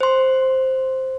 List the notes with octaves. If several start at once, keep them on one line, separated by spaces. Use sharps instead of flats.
C5 C6